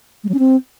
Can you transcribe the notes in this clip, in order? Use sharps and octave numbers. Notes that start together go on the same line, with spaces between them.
G#3
F#3
C#4
C4